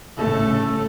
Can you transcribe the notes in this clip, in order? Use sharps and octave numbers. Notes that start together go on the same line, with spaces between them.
G1 A2 C#3 A3 A4